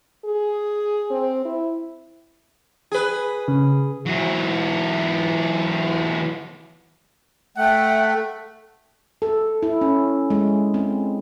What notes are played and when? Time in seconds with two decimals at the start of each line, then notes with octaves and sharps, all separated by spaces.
0.25 G#4
1.11 C4
1.45 E4
2.92 G#4 B4
3.48 C#3
4.06 E3 F#3
7.57 A3 F#5 G5
9.22 A4
9.63 E4
9.81 C#4
10.30 G#3
10.74 C4